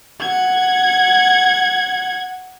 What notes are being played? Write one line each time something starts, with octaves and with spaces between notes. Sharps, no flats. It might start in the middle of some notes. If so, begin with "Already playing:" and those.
F#5 G#6